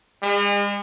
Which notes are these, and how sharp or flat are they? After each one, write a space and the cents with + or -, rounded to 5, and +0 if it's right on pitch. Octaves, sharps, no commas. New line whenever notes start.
G#3 -40